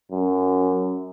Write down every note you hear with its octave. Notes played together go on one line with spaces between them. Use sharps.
F#2